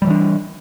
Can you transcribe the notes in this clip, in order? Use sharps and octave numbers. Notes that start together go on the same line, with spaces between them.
E3 F#3 G3 D4